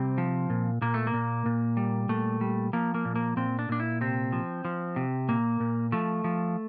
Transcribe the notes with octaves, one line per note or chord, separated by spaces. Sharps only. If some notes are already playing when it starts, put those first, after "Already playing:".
Already playing: C3 G3 C4
F3
A#2
A#2 A#3
A3
A#3
A#2
A#2
G3
A#2 A3
G3
F3 A#3
A#3
A#2
A#3
A#2 C4
D4
A#2 D4
E4
C3 C4
F3
F3
C3
A#2 A#3
A#2
F3 A3
F3